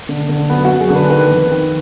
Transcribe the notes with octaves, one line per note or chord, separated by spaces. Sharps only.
D3
D3
F#2 B3
F#2 F#4
G#4
D3
B4
D#3 B4
F2
D#3